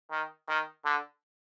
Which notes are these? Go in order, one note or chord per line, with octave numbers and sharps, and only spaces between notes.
D#3
D#3
D3